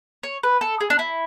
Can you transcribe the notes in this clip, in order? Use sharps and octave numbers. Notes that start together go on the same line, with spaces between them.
C#5
B4
A4
G#4
D4
E4